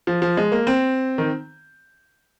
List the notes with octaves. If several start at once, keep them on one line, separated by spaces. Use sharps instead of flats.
F3
F3
G#3
A#3
C4
D#3